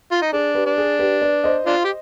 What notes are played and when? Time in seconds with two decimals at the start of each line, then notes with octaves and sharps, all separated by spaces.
0.12 F4
0.22 D#4
0.33 D4 G#4
0.55 G4 B4
0.66 D4
0.78 G#4
0.99 G4 B4
1.22 B4 D5
1.44 C5 D#5
1.66 D4 F4
1.85 G4